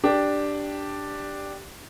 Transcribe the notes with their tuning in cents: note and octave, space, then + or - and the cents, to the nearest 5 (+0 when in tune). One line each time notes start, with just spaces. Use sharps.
D4 +0 G4 +0